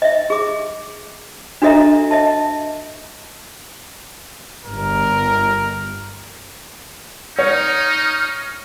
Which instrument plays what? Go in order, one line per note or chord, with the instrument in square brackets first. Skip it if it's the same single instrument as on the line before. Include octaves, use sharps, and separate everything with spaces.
[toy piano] D#5 E5
G#4 D6
D4 F#4 A4 D#5 E5 A#5
D#5 E5 A5
[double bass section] G1 [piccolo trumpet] A#4
[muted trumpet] D#4 [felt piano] C#5 [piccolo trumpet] F6